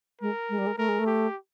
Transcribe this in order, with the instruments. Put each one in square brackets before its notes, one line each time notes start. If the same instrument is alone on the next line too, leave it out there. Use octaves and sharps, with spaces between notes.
[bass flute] G#3 [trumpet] A#4
[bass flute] G#3
G3
G#3
[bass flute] A3 [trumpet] A#4
[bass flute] G#3
A3
[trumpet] G4